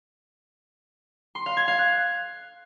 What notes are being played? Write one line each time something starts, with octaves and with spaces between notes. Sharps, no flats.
C6
F5
G#6
F5
F#6